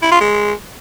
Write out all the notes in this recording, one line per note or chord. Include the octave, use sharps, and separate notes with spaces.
E4
F4
G#3